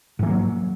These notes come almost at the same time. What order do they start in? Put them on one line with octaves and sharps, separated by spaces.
G#2 E3 A#3 F#3